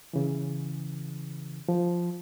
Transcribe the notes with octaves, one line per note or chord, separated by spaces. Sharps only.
C#3 E3
F3